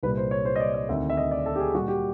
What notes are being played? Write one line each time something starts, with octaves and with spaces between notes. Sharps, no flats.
C2 A#2 G3 B4
C5
C#5
C5
D#5
D5
D#5
D2 C3 D#3 E5
E5
D#5
D5
A4
G4
G#4
A#2 G3 F#4
G4